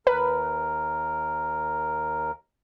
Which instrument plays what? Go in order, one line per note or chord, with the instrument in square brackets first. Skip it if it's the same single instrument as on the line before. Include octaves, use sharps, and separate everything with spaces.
[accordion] D#2 A#4 [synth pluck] B4